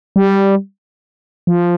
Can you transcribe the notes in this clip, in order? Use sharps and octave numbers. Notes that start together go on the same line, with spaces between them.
G3
F3